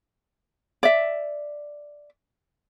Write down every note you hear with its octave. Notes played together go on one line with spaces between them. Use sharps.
D5 E5